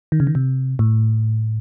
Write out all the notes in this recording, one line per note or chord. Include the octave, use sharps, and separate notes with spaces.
D#3
C#3
D#3
C3
A2